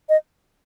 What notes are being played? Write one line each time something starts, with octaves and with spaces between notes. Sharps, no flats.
D#5